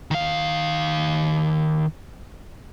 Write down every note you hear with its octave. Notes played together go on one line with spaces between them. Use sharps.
D#3 F5